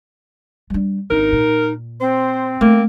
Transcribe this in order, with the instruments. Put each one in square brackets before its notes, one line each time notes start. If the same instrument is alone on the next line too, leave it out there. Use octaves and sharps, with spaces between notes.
[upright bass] G3 D4
[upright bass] G#1 D4 [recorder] D#4 [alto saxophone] A#4
[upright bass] A#2
[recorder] C4 [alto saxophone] C5
[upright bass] A3 [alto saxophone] A#3